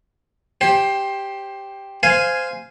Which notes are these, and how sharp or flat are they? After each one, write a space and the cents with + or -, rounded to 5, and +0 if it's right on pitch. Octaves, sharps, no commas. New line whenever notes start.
G4 +0 C5 +20
C5 -15 F5 -5 G#5 +0